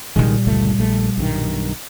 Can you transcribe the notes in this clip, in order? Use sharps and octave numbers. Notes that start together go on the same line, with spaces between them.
C2 A#2 D#3 G3 G#3
G1 C#2 A3
A#1 A3
B1 G2 D#3